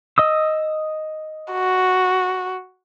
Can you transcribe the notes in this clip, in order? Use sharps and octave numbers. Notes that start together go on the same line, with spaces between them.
D#5 D#6 E6
F#4